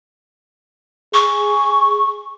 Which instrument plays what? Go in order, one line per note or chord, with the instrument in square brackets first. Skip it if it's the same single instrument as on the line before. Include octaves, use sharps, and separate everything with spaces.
[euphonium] G#4 [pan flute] C#6